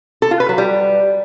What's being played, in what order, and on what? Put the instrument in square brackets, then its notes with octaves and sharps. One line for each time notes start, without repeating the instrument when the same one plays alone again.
[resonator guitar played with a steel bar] A4
F4
B4
F#3
G3